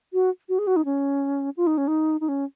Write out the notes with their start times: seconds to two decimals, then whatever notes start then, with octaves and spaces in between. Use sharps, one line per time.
0.13 F#4
0.49 F#4
0.59 G#4
0.67 F#4
0.76 D#4
0.85 C#4
1.57 F4
1.67 D#4
1.77 C#4
1.87 D#4
2.21 D#4
2.28 C#4